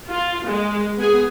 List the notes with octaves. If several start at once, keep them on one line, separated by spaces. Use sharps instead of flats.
F4
G#3
B3 G#4